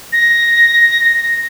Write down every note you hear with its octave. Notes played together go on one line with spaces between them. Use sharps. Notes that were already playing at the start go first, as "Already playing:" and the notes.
A#6